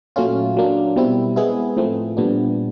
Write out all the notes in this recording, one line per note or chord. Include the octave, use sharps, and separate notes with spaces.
A#2 F#3 A3 C#4 F4
F#3 A#3 D4
B2 G3 C4 E4
G#3 B3 E4 G#4
A2 F3 A3 C4
A#2 G3 B3 D4